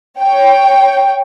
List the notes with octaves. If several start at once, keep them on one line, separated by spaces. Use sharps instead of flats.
C#5 G5